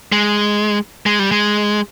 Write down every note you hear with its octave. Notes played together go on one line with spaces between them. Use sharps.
G#3
G#3
G3
G#3